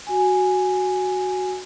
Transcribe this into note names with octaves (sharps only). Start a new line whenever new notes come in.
F#4 G#5